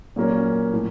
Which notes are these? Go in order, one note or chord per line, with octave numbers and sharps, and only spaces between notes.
A#2 F#3 A#3 C#4
A2 F3